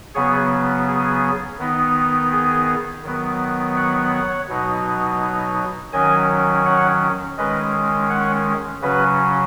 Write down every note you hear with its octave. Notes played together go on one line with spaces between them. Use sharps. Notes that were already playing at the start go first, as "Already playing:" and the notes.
C#3 F#3 B3 G#4 C#5
G#4
D#3 B3 D#4
G#4
D#3 F#3 B3
C#5 F#5
B2 F#3 D#4
D#3 F#3 C#4 D#5 G#5
C#5 F#5
D#3 G#3 C#4 B4 D#5
C#5 F#5
C#3 F#3 C#4 F#4 B4